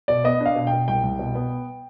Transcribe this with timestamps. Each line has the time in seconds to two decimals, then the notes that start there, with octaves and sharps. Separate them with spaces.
0.08 B2 D5
0.24 B3 D#5
0.41 D4 F5
0.55 B2
0.67 G5
0.73 B2
0.88 C2 G5
1.03 C2
1.19 B2
1.35 B3